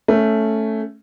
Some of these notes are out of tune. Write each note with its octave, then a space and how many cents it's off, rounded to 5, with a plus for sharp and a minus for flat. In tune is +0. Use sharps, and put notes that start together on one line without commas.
A3 +0 C#4 +0